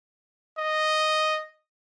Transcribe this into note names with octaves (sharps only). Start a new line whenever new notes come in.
D#5